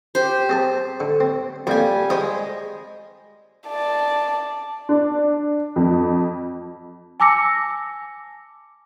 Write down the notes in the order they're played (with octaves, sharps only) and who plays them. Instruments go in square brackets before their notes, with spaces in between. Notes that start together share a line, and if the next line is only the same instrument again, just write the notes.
[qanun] G4 C5
[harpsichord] C4 G#4 A5
D3
C4
[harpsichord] F2 A#3 [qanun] G3 G#5
[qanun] G#3 [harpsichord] G#4 C5 G5
[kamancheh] D5 A5
[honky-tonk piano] D4
F2
[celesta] G#5 A5 D6 E6 A#6 C#7